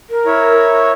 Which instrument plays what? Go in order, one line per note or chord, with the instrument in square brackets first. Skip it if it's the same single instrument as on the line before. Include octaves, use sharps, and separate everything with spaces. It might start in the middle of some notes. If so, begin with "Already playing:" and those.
[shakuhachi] A#4
[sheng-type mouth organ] E4 C#5